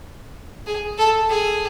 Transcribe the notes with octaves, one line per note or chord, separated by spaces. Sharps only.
G#4
A4
G#4